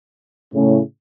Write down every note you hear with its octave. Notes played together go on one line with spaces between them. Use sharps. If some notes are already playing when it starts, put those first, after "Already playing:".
A2 C#3